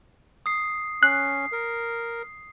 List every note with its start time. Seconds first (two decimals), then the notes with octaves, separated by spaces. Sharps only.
0.46 D#6 C7
1.03 C#4 F#6 C7
1.52 A#4